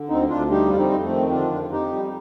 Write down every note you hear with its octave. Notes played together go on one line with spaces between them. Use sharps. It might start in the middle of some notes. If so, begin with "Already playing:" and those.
Already playing: D3
D2 C4 D#4
D2 D4 F4
G3 D#4 G4
F2 F4
C4 D#4
F2
A3 C4
D#3
D3 D4 F4
F2
F2 D#4 G4
G3